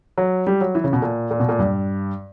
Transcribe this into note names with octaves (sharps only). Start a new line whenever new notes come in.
F#3
G3
F#3
E3
C#3
B2
A#2
A#2
B2
A#2
G2